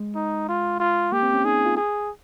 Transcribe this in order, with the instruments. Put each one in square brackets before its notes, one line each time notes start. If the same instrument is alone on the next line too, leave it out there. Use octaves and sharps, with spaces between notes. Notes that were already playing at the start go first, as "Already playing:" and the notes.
Already playing: [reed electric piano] G#3
[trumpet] D#4
F4
F4
[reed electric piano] A#3 [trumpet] G4
[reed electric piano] C4
C#4
[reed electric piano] D#4 [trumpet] G#4
[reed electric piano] F4
[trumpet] G#4